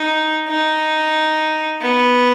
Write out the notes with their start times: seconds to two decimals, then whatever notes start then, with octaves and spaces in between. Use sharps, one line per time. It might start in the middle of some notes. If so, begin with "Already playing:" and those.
Already playing: D#4
0.48 D#4
1.81 B3